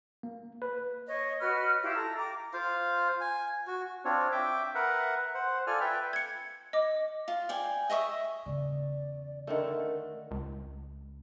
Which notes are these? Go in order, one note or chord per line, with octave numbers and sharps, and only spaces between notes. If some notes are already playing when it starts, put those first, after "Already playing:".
A#3
B4
C#5 D#5
F#4 B4 D#5 F6
E4 F4 G4 F5
A4 A#5
G5 A#5 D6
F4 C5 F5
G#5
F#4
C4 D4 F4 C#5
E5 G5 D6
A#4 B4 E5 F#5
C5 F#5
F4 A4 D5 G#5 F6
B4 E5 G5
G#6 C#7
D#5 D6
F4
D5 G5 G#5
D#5 E5 C#6 D#6
E2 C#3 D5
D3 D#3 A3 A#4
C#2